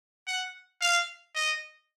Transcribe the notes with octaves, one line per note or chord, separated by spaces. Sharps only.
F#5
F5
D#5